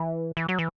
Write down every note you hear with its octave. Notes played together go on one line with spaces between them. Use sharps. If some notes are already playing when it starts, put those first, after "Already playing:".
Already playing: E3
E3
F#3
E3